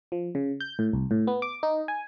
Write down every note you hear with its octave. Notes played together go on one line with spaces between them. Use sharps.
F3
C#3
G6
A2
C2
A2
B3
D6
D#4
G#5